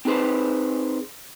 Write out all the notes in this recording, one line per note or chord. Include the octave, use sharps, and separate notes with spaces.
C4 D#4 G#4 B4 C5